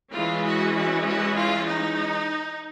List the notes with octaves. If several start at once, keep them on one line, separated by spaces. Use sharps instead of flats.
E3 G#3 C#4 F4
F#4
F#4
F#4
F4
D#4